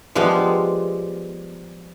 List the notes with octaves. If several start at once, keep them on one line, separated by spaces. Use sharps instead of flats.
F3 G3 G#3 B3